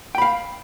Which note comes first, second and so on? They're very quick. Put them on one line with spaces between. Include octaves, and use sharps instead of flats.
G5 B5 F5